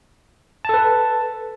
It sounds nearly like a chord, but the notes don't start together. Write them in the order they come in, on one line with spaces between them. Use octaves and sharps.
A5 A4 B4